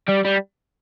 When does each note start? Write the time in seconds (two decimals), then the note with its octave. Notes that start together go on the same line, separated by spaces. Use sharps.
0.09 G3
0.25 G3